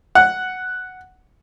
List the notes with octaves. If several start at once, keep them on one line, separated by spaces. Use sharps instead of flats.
F#5